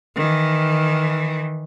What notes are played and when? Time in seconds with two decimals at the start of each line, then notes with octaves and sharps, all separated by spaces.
0.16 D#3 E3